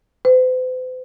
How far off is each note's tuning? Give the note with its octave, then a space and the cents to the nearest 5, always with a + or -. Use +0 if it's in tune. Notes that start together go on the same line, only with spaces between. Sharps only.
C5 -45